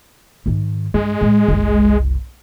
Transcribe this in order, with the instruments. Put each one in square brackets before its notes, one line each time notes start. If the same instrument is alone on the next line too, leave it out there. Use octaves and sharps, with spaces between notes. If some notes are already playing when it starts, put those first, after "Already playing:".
[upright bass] G#2 D#3
[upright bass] G2 [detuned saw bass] G#3
[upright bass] A2
F#1 C2